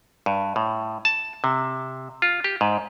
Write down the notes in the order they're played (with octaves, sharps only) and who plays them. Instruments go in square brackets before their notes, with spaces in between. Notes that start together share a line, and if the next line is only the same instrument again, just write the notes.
[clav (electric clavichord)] G2
A2
A5
C3
F4
G4
G#2